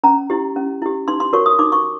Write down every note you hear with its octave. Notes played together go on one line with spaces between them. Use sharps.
C#4 A#5
E4 G4
C#4
E4 G4
D#4 C6
C6
F#4 A#4 C#5 C#6
D#6
D#4 D6
C#6